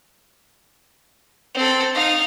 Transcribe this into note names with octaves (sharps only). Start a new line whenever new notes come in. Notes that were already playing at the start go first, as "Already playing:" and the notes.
C4 A4
D#4 F5